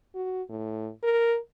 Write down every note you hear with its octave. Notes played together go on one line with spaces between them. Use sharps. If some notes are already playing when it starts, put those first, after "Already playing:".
F#4
A2
A#4